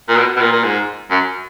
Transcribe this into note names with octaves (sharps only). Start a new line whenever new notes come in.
A#2
B2
B2
A#2
A#2
G#2
F#2